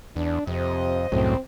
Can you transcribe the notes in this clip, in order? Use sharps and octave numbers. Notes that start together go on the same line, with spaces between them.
E2 D4
F2 C3 C5 D#5
C2 F#2 A2 C4